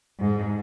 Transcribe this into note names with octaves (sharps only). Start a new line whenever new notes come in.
G#2